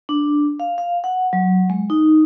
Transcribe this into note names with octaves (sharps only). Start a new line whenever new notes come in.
D4
F5
F5
F#5
F#3
G#3
D#4